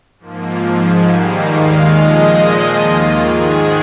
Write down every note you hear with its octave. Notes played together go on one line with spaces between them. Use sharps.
G#2 F3 A#3
G#2 F3 G#3
G#2 D#3 G3 A#3
D#2 D#3 G#3 F5
A#2 F3 G#3 D#5
A#2 F3 G#3 D#5
D#2 D#3 A#3 F4
G#2 D#3 G#3 G#4